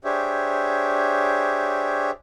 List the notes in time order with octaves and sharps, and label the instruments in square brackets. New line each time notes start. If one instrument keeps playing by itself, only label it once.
[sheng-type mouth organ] D4 G4 G#4 C5 C#5 E5